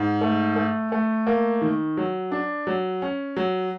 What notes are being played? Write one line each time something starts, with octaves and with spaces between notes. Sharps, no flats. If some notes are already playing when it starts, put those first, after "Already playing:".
Already playing: G#2
A3
A3
A3
A#3
D#3
F#3
D4
F#3
C#4
F#3